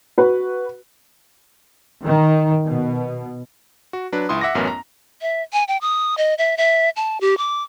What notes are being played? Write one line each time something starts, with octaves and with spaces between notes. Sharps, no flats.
F#4 B4
D#3
B2
F#4
F#3 D4 B4
C#2 E4 C6 D#6
E5 F#5 D6 A#6
A1 F#2 B3 C#4 A#4
A#5
E5
G#5
G5
D#6
D#5
E5
E5
A5
G4
D6